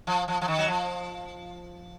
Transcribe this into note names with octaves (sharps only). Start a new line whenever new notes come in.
F3
F3
F3
D#3
F#3
F3